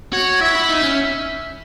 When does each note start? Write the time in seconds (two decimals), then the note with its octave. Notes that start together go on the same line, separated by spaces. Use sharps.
0.13 F#4 C#5
0.40 E4 E5
0.55 E4
0.69 D#4
0.83 C#4